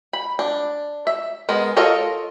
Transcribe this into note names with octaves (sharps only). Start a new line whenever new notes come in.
B5
D4
E5
G#3 B3 A#4
F4 A4 A#4 C#5 D#5